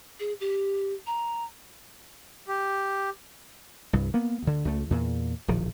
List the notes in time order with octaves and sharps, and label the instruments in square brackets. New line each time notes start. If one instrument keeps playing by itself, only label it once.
[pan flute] G#4
G4
A#5
[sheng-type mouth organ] G4
[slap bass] C2 G2
A#3 B3
D2 D3
C#2 A3
E2 A#2
D1 A#1 D#3 F3